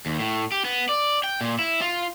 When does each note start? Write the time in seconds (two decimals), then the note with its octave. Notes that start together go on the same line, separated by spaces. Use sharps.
0.06 D#2
0.20 A2
0.52 G4
0.65 B3
0.89 D5
1.24 G5
1.41 A#2
1.59 E4
1.81 F4